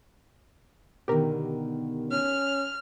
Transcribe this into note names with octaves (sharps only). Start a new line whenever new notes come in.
B2 D3 D#3 G4 A#4
C#4 F6